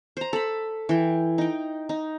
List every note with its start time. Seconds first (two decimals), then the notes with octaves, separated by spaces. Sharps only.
0.17 C5 A#5
0.33 A4 B5
0.89 E3 G5
1.38 D#4 G5
1.89 D#4